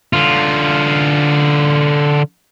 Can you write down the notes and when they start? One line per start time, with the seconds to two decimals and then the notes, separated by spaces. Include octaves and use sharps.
0.13 D3 F4